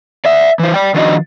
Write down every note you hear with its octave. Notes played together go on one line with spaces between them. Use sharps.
D5 E5
E3 C5
D5 G5
D#3 F3 D4 F#4 D5 D#5